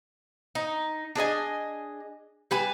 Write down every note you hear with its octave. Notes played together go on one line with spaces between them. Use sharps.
D#4
D4 G#4 D#5 G#5
G3 B4 G#5